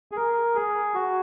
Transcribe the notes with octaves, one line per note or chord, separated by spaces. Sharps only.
G#4
A#4
G#4
F#4